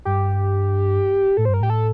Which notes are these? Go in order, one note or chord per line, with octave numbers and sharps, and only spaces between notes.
G2 G4
A2 A4
C5
G2
A#4
A2 G4
A4